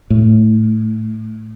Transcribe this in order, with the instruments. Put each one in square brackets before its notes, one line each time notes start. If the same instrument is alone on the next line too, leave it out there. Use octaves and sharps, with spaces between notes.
[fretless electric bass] A2